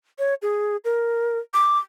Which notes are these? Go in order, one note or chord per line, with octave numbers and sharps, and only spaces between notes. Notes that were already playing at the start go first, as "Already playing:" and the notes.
C#5
G#4
A#4
D6